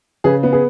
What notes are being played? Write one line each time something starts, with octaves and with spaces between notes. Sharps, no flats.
C#3 G#4 B4
B3
G#4 B4